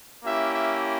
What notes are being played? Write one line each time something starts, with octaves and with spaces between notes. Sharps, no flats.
A#3 C#4 E4 G4 E5
E5